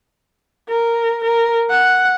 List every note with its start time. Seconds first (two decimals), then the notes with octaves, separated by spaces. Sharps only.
0.69 A#4
1.25 A#4
1.71 F#5